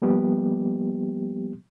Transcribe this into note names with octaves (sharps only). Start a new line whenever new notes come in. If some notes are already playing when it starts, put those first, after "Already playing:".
F3 G3 A#3 B3 G4